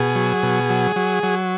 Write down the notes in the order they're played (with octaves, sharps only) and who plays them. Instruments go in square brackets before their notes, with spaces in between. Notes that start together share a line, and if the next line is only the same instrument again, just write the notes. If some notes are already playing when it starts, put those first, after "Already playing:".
Already playing: [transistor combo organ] B2 G#4
F#3
B2
F#3
F#3
F#3